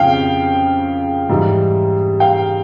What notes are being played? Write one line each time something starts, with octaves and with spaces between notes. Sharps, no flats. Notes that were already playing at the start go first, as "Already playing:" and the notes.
Already playing: F2 C#3 F3 F5 G5
G#2 E3 G3
F5 G5